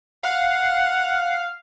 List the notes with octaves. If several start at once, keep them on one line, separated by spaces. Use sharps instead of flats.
F5 F#5